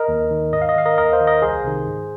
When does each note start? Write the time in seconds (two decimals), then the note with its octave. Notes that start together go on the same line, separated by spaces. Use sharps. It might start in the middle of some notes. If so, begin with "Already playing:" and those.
Already playing: A#4 D#5
0.08 D#2
0.31 D#3
0.52 G#2 D#5
0.62 F5
0.69 D#5
0.76 D#3 F5
0.86 A#4 D#5
0.98 D#2 A#4 D#5
1.13 C5 F5
1.21 D#3
1.27 A#4 D#5
1.42 C2 G#4 C5
1.64 C3 D#3
1.87 G#2